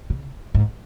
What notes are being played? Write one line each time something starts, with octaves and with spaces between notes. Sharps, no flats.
C#3
G#2